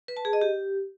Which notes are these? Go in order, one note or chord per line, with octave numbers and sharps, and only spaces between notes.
B4
A5
G#4
D#5
G4